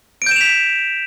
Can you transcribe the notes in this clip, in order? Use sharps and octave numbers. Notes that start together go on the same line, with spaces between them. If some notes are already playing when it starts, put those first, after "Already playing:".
G6 B6 D7 E7 F7